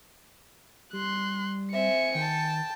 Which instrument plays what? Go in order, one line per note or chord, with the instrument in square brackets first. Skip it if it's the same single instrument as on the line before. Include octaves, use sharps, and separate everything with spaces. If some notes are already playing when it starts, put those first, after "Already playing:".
[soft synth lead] G3 [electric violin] C6 F#6
[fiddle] C4 E5 [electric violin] G#5 C#7
[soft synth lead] D#3 [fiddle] G5 A5